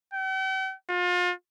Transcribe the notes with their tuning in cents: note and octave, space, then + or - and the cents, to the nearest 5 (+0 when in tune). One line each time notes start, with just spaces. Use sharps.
G5 -45
F4 +35